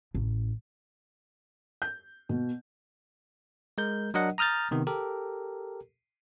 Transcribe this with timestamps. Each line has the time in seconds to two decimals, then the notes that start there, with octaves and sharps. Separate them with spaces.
0.15 A1
1.82 G6
2.29 B2
3.78 G#3 A#4 G6
4.14 F#3 D4 A#4 D#5 F#5
4.38 A#5 D#6 F6 G6 A6
4.71 C3 D#3 B3
4.87 G4 A4 A#4